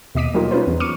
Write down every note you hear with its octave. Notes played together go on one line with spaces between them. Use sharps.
D#2 B2 D#5 D6 B6 D#7
F#3 G3 A#3 D#4 F4
C#4 D#4 F4 B4 C5
E2
C#6 D6 F6 C#7 D#7